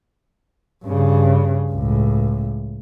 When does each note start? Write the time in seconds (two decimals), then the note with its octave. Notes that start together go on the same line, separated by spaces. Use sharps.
0.84 G2 C#3
1.72 C#2 A2